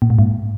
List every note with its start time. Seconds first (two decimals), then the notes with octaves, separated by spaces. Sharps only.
0.02 A#2
0.10 A2
0.19 G#2